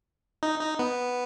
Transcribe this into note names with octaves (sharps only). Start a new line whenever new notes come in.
D#4
D#4
B3